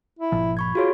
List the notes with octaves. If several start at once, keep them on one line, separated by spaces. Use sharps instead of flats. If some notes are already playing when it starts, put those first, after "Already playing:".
E4
G1 A#2 F3
B5 C#6 G#6
F4 F#4 G#4 C#5